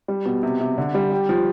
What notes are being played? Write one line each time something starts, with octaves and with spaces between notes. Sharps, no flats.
G3
B2
C3
C3
D3
G3
G4
F3